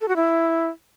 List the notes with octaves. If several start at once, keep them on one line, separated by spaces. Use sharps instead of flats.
A4
F#4
E4